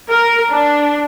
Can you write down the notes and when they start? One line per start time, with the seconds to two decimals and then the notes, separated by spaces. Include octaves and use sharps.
0.10 A#4
0.50 D4